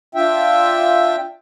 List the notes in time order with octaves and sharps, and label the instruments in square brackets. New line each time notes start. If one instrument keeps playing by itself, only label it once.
[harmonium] D4 F4 E5 G5